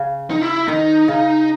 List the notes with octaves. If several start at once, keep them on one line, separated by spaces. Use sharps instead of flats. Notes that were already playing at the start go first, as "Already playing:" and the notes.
Already playing: C#3
D#4
E4
D#3 D#4
C#3